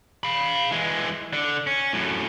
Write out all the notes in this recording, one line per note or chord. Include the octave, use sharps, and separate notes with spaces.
F5 B5
E3 G#3
D3
C#4
F#2 A2